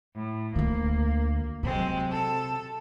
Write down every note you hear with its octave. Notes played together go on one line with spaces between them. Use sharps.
A2
D2 D3 A#3
C3 F#3 G#3 C4
A4